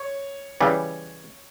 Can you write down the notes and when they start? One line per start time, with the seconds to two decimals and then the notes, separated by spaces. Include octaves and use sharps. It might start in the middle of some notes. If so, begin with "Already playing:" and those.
Already playing: C#5
0.61 C#3 E3 G3